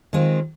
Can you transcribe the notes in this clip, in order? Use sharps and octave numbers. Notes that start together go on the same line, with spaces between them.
D#3 G#3 C4 F4